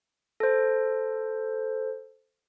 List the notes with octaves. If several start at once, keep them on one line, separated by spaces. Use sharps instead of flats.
A4 C5